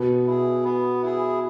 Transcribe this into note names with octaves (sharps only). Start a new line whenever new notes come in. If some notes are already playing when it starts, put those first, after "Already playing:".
Already playing: B2 B3
E4 G#4
B3
E4 G#4